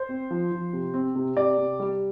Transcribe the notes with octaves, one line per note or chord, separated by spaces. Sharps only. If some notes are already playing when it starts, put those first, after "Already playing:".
Already playing: C5
C4
F3
F3
C3
C4
C3
C3 D5
C3
G3